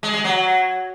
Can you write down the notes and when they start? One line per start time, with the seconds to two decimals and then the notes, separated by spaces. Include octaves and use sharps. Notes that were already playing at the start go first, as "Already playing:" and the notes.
0.03 G#3
0.14 G#3
0.24 F#3